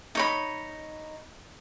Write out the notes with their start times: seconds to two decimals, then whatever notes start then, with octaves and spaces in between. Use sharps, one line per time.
0.15 D#4 C#5 B5